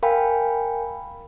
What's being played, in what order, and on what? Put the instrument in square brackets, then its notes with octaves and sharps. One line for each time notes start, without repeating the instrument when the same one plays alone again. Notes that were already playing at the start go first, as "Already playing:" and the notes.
[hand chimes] A#4 F5 G5 G#5 B5